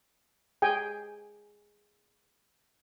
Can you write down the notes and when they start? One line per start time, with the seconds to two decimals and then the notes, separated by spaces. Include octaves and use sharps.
0.62 G#4 G5 G#5